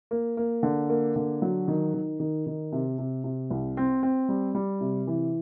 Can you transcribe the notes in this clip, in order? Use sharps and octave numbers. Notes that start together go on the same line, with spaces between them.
A#3
A#3
D3
A#3
D3
F#3
D#3
D#3
D#3
D#3
C3
C3
C3
C2
C4
C4
G3
G3
C3
E3